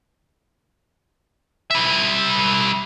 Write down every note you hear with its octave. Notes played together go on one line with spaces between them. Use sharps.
G3 E5